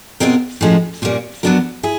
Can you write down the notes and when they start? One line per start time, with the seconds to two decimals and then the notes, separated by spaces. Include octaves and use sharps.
0.20 B2 G#3 C4 F4 A#4
0.61 A2 F3 G#3 C#4
1.02 A#2 G3 A#3 C#4
1.43 F#3 B3 D4 F#4 A#4
1.83 E4 G#4